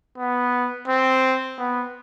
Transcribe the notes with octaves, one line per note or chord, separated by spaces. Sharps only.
B3
C4
B3